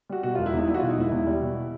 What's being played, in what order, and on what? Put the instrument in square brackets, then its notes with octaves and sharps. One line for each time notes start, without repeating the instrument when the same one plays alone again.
[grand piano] G3 F#4
B2 F#4
E1 F4
E4
E2 D#4
G3 E4
F#4
B2 F4
D#4
E1 E4
E2
G3
B2